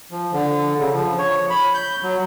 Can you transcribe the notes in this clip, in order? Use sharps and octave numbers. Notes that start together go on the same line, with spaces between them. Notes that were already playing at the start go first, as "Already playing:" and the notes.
F3
D3
C#3
F3
C#5
B5
G6
F#3